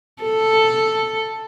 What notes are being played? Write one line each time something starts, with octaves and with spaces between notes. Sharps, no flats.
A4